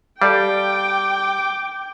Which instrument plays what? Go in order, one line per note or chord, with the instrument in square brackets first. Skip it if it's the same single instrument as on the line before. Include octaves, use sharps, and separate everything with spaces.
[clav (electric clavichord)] G3 [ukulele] A4 D5 F5 [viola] G5 [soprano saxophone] D6